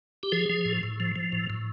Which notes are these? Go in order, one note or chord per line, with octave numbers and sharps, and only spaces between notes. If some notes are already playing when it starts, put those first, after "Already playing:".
G4
F3 G#4
F3
A2
A2
F3
F3
A2
A2